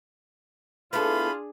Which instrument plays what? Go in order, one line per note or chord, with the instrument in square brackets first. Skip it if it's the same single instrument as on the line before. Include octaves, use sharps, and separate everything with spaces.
[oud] B3 E4 A4 [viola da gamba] D4 G#4 [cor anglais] F4 [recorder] B5